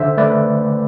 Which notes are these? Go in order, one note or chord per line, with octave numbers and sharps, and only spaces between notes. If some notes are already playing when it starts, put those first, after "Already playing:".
Already playing: D3 C5 E5
A3 B4 D5